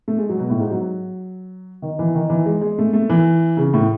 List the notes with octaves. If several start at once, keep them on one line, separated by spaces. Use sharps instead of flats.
A3
G#3
F#3
B2
A2
G#2
F#3
D#3
E3
D#3
E3
G#3
G#3
A3
A3
E3
C#3
A2